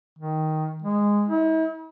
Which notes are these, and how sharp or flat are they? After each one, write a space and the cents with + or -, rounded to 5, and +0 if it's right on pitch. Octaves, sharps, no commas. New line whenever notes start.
D#3 +5
G#3 -10
E4 -45